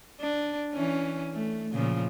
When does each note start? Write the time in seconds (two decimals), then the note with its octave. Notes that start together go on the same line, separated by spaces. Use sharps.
0.20 D4
0.73 E3 C#4
1.34 A3
1.73 A#2 C#3 F3